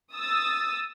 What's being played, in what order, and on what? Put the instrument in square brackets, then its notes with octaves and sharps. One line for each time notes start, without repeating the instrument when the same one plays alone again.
[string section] D#6 E6 A6